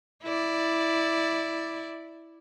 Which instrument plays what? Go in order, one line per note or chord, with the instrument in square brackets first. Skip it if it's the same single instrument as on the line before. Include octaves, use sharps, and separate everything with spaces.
[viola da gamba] E4 D5